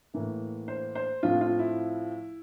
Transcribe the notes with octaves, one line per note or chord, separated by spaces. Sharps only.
A2 E3 A#3
C5
C5
A2 F3 C4 F4
F4
E4